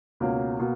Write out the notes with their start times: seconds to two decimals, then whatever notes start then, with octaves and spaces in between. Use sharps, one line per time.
0.20 C#2 B2 A#3 C#4
0.59 B2 A#3